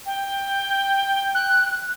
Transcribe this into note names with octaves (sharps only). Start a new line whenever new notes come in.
G5
F#6